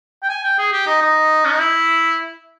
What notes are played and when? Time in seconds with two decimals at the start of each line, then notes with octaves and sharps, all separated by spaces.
0.23 G5
0.29 G#5
0.43 G5
0.58 G#4
0.73 G4
0.86 D#4
1.02 D#4
1.45 C#4
1.52 D#4
1.60 E4